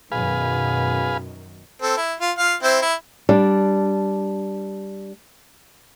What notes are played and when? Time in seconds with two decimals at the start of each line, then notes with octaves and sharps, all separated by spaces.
0.12 F#2 B2 D#3 G#4 B4 F5
1.82 C4 A4
1.97 E4
2.20 F4
2.39 F4 F5
2.63 C4 E4 C5
2.82 E4
3.29 G3 D4